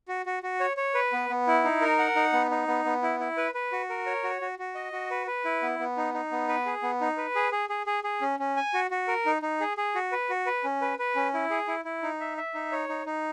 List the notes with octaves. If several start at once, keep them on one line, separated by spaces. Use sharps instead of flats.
F#4
F#4
F#4
C#5
C#5
B4
B3
B3
E4
D#4
A#4
F#5
D#4
B3
D#4
B3
B3
E4
E4
B4
B4
F#4
A#4
C#5
F#4
F#4
F#4
D#5
F#4
B4
B4
E4
B3
B3
D#4
D#4
B3
B4
G#4
B3
D#4
B4
G#4
G#4
G#4
G#4
G#4
C#4
C#4
G#5
F#4
F#4
A#4
D#4
D#4
G#4
G#4
F#4
B4
F#4
B4
C#4
B4
B4
C#4
E4
G#4
E4
E4
D#4
E5
E5
D#4
C#5
D#4
D#4